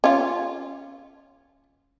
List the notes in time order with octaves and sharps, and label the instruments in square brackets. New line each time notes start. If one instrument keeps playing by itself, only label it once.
[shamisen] C#4 F4